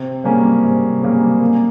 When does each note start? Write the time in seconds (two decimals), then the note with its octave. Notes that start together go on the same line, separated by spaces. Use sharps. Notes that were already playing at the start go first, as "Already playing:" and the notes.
Already playing: C3
0.24 G3 A#3 C#4 G#4
0.64 C3
1.02 G3 A#3 C#4 G#4
1.40 A#3